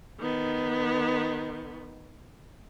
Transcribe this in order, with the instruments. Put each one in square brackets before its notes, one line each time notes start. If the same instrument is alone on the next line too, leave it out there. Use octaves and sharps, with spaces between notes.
[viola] D#3 B3